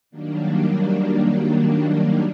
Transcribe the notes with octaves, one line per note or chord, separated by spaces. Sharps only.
D#3 F#3 G3 A#3 D4